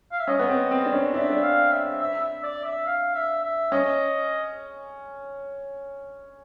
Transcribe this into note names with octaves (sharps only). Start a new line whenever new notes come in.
F5
E5
C#4 D#5
B3
C4
C4
D4
C#4
D4 E5
D4
F5
E5
E5
E5
D5
E5
F5
E5
E5
C#4 D#5